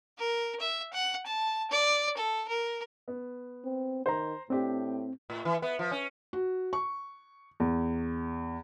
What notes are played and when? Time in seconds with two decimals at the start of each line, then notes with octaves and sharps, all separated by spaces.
0.19 A#4
0.60 E5
0.93 F#5
1.26 A5
1.71 D5
2.17 A4
2.49 A#4
3.08 B3
3.65 C4
4.06 D#3 C5 A#5
4.50 A2 C4 D4 G4
5.30 A2
5.45 E3
5.62 B3
5.79 F3
5.91 C#4
6.33 F#4
6.73 C#6
7.60 E2